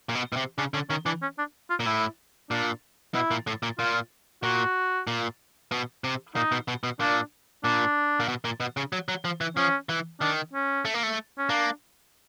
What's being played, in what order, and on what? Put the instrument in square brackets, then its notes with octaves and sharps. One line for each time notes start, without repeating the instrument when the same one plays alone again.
[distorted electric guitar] A#2
B2
B2
C3
[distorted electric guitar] C#3 [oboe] D4
[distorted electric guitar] D3 [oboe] C#4
[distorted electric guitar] D#3 [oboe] C#4
[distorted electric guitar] E3 [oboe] D4
[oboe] C#4
D4
F4
[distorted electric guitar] A#2
[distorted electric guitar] A2 [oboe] E4
[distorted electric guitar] A#2 [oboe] D4
[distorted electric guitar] B2 [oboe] E4
[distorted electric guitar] A#2
A2
A#2
[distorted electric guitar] A#2 [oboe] F4
[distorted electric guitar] A#2 [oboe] F#4
[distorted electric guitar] A#2
B2
C3
[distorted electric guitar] A#2 [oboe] D#4
[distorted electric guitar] B2
B2
B2
[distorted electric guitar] A#2 [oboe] D4
[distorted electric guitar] A#2 [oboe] D4
[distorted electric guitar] A#2
B2
A#2
B2
C#3
F#3
F#3
F3
E3
[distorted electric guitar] F3 [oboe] C#4
[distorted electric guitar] E3
[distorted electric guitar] D#3 [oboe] D4
[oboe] C#4
[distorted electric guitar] A3
A#3
A3
[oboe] C#4
[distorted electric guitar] A#3 [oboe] D4